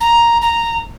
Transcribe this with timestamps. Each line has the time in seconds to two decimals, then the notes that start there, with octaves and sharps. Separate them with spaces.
0.01 A#5
0.42 A#5